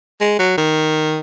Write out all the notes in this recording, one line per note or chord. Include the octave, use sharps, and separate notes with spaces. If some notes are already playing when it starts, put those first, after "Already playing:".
G#3
F#3
D#3